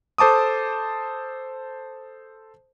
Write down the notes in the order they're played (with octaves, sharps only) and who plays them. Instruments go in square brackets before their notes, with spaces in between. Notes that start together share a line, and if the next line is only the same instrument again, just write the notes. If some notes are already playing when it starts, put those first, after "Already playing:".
[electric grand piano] A4 C5 A5 D6 D#6